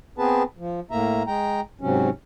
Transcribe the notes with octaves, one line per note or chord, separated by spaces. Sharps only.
B3 C4 G#4 B4 A5
F3
A2 A#3 E5 A#5
G#3 G5 A#5
G#2 C3 F#3 C#4